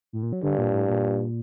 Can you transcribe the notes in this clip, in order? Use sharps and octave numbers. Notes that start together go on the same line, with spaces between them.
A2
A#2
F#3
G2 D3
A#2
A2
A#2